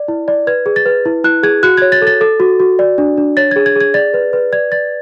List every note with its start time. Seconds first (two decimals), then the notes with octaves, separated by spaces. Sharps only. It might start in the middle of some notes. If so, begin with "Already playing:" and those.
Already playing: D5
0.08 E4
0.28 D5
0.47 B4 G#6
0.66 G#4
0.76 A6
0.86 B4
1.05 E4
1.24 E4 F#6
1.43 G#4 G#6
1.63 F#4 F#6
1.78 C#5 G#6
1.92 A6
2.02 A4
2.07 A6
2.21 A4
2.40 F#4
2.60 F#4
2.79 D5
2.98 D4
3.17 D4
3.37 C#5 A6
3.51 G#4 G#6
3.66 G#6
3.76 G#4
3.81 G#6
3.94 D5 A6
4.14 B4
4.33 B4
4.52 D5 G#6
4.72 D5 A6